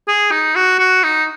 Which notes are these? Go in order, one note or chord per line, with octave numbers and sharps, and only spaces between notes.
G#4
D#4
F#4
F#4
D#4